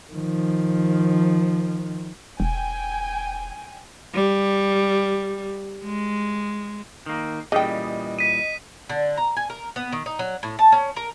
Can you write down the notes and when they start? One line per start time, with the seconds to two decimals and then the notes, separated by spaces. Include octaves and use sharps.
0.12 D#3 F3
2.40 E1 G5 G#5
4.14 G3
5.85 G#3
7.06 D#3 A#3
7.52 A#2 C#3 E3 G3 D#5 G5
8.19 B6 D#7
8.89 D3
9.17 A#5
9.37 G#5
9.50 A#4
9.76 B3
9.92 D#3
10.06 D#4
10.19 F#3
10.43 A2
10.59 A5
10.72 C#4
10.96 A#4